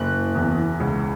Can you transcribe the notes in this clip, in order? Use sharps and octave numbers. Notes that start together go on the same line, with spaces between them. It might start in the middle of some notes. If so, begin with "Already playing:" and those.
Already playing: F#1 F#6
E2
C#2